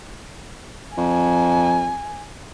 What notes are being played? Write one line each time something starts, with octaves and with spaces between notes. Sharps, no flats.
F2 G#5